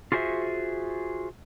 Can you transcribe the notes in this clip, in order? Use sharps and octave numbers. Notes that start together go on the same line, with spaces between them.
F4 F#4 G#4 C5 D#5 E5